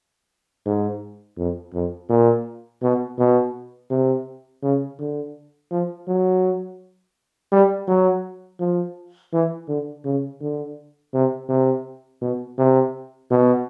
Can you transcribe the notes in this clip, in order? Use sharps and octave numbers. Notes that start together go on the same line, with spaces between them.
G#2
F2
F2
A#2
B2
B2
C3
C#3
D3
F3
F#3
G3
F#3
F3
E3
D3
C#3
D3
C3
C3
B2
C3
B2